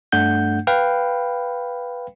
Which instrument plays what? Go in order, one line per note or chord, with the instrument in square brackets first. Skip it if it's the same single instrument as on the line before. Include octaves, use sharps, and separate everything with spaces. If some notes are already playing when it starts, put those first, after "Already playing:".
[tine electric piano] G2 A3 D4 F#5 G6
B4 F5 G5 B5